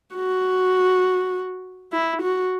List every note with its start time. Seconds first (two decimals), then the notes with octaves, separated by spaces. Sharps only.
0.15 F#4
1.92 E4
2.22 F#4